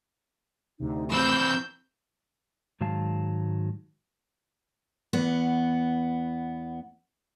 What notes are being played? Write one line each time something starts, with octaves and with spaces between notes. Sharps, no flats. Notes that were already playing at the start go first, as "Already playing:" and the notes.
D2 C3 D#4
E3 C4 B5 E6 G6
G#2 D#3 F#3 G#3 F5 A5
E2 B3 F#5